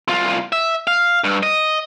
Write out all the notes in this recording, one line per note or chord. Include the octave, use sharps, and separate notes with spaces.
C2 F4
E5
F5
G2
D#5